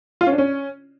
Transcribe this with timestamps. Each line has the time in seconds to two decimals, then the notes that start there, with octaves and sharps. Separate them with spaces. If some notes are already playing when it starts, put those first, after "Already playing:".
0.21 F4
0.27 C#4
0.32 D4
0.38 C#4